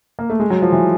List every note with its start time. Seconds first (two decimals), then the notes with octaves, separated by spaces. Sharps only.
0.19 A#3
0.30 A3
0.40 G#3
0.50 F#3
0.62 F3
0.72 E3